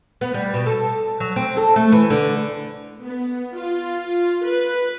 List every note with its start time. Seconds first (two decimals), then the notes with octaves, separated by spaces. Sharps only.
0.21 B3
0.34 G3
0.54 B2
0.66 A4
1.20 F#3
1.36 C4
1.57 A4
1.76 A3
1.92 E3
2.10 D3
3.03 B3
3.54 F4
4.46 B4